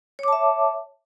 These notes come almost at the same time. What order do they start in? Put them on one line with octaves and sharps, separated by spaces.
C#5 D6 A5 E5